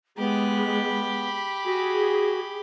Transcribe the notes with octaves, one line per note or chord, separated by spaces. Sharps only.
G#3 B3 G4 B5
F#4 G#4